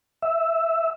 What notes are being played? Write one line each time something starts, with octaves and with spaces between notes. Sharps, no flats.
E5